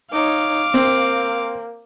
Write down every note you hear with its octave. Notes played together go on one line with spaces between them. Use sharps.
D#4 C#5 F5 D6
A#3 C4